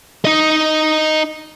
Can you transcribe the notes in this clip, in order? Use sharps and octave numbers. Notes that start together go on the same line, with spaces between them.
D#4 D#5